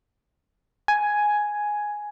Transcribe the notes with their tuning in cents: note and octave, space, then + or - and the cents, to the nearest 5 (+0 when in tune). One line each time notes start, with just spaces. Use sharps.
G#5 +5